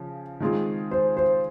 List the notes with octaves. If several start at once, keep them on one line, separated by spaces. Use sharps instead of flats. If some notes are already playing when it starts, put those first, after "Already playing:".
Already playing: C#3 F3
D#3 G#3 C4 F4 G#4
C5
C5